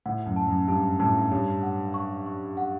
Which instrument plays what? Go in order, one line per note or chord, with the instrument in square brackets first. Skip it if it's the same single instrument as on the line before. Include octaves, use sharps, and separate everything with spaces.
[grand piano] A2 [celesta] F#5
[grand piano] F#2
[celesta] A5
[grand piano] F#2
[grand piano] G2 [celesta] A5
[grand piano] A2 [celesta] A5
[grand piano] G2 [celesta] C#5
[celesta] F#5
C#6
C#6
F#5